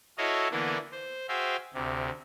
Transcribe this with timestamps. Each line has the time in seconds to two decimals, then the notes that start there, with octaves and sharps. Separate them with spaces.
0.18 E4 F#4 A4 C#5 D#5 F5
0.51 D3 E3 A#3 B3 D4 E4
0.92 C5
1.29 F#4 G#4 C5 E5 F5 G5
1.74 D2 C3